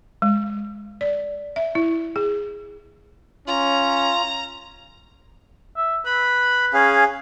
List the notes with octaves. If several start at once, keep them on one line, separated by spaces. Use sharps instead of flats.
G#3
D5
E5
E4
G#4
C#4 F4 A#5
E5
B4 B5
C#4 G#4 F5